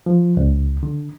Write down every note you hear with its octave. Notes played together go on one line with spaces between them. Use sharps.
F3
C#2
D3